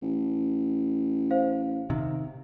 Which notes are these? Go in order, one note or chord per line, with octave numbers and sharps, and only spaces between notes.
A1
C5 F5
C3 D#3